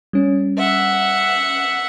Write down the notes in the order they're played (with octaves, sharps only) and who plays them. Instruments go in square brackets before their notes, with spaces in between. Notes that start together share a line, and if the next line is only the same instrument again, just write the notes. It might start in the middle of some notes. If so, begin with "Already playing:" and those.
[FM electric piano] G3 C#4
[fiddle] E5 F#5